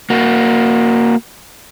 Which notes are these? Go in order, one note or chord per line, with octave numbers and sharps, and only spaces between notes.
A#3 F#4